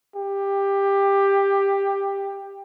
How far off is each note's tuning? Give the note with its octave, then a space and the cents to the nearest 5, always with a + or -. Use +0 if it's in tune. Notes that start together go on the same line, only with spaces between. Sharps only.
G4 +15